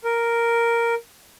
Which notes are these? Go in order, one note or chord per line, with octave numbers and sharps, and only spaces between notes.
A#4